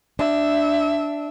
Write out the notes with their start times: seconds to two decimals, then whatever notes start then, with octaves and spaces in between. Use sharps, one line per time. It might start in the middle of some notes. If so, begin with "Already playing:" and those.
0.19 D4 E5